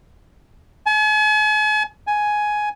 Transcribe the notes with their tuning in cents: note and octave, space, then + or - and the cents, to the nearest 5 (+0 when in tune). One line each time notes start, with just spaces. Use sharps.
G#5 +45
G#5 +10